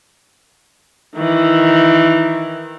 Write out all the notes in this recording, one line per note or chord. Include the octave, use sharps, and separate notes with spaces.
D#3 E3